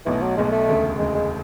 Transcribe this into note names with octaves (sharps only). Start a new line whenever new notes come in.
B1 B2 E3 F#3 A3
F#3
B1 B2 F#3 G#3 A3
A3
E1 D2 C#3
E1 D2 C#3 G#3
G#3